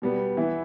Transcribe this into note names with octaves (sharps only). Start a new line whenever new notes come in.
B2 G3 B3
E3 B3 E4